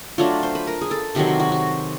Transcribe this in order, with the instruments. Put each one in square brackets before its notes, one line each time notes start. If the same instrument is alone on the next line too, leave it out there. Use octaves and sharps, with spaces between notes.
[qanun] F#3 A3 D4 F4 C#5
C5
B4
A#4
G#4
A4
C3 D#3 F#3 G4
F#4
F#4
F#4